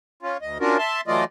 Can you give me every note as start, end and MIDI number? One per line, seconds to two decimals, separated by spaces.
0.23 0.37 61
0.23 0.37 65
0.42 0.58 38
0.42 0.58 75
0.60 0.77 61
0.60 0.77 62
0.60 0.77 65
0.60 0.77 66
0.60 0.77 70
0.78 1.01 76
0.78 1.01 81
0.78 1.01 84
1.07 1.24 52
1.07 1.24 54
1.07 1.24 57
1.07 1.24 65
1.07 1.24 74
1.07 1.24 75